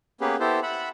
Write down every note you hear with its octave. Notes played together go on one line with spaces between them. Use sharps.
A#3 B3 C#4 G4 G#4 B4
B3 E4 G4 A4 C5
E5 F#5 B5